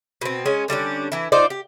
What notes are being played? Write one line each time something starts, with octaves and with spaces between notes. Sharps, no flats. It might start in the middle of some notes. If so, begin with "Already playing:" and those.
B2 C4
G#3 C#4 G#5
D3 G3 C#4 D4
E3 E4
D#4 F4 C5 D5
G4